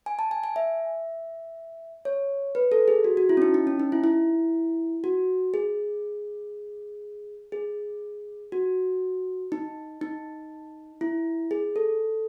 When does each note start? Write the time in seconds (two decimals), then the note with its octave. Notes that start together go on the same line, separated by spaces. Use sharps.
0.06 G#5
0.19 A5
0.31 G#5
0.44 G#5
0.56 E5
2.05 C#5
2.55 B4
2.72 A4
2.88 G#4
3.04 F#4
3.17 F#4
3.29 E4
3.37 C#4
3.42 D#4
3.54 D#4
3.67 C#4
3.80 D#4
3.92 E4
4.04 E4
5.04 F#4
5.54 G#4
7.52 G#4
8.52 F#4
9.52 D#4
10.01 D#4
11.01 E4
11.51 G#4
11.76 A4